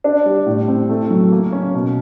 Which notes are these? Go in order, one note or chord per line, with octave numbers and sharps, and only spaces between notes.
D4
G3
A2
C4
A3
F#3
A#3
C#4
B2